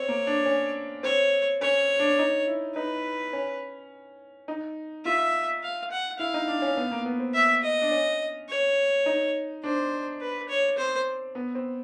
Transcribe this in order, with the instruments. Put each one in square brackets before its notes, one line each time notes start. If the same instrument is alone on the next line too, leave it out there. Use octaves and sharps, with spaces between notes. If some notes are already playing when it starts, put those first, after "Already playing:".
Already playing: [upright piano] C4 [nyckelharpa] C#5
[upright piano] A#3
D4
C#4
[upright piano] C4 [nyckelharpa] C#5
[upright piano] C#4 [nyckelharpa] C#5
[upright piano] D4
D#4
E4
[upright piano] D#4 [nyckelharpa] B4
[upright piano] C#4
D#4
[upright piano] F4 [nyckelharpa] E5
[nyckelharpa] F5
F#5
[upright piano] E4 [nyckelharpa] F5
[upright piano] D#4
D4
C#4
B3
A#3
B3
C4
[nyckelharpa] E5
D#5
[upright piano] D4
C#4
[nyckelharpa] C#5
[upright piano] D#4
[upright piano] D4 [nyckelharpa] C5
[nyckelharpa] B4
C#5
[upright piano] C4 [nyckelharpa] C5
[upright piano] B3
C4